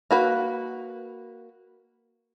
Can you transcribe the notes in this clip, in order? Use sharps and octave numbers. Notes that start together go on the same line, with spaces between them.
A#3 F#4 B4